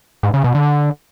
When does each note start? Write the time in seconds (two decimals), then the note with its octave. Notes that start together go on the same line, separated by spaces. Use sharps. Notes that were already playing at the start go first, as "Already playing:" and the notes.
0.23 G#2
0.34 C#3
0.44 B2
0.55 D3